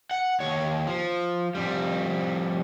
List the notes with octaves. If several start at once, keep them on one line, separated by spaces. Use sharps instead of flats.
F#5
D#2 C#5
F3
F2 G3